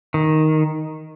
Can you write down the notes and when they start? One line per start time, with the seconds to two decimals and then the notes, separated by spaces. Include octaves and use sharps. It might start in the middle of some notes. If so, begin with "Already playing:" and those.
0.14 D#3